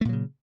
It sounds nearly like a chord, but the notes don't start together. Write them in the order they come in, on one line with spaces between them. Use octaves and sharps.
A3 A#2 F#3 C#3